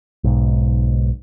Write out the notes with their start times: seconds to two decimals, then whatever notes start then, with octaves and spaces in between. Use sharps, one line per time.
0.24 B1 G#2